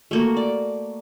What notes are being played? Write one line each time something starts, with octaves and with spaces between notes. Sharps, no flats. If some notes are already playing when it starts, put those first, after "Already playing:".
A3 A#3 F#4
D5